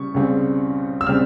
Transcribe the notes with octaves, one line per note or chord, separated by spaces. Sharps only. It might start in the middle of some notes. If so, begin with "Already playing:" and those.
Already playing: C#3 G3 C#6
C#2 C#3 G3 C4
E6
C#3 G3 C4 F6